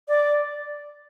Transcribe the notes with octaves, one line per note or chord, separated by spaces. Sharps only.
D5